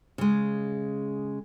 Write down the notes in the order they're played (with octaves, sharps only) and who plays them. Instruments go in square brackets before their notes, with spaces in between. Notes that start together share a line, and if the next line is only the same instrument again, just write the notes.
[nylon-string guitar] C#3 G#3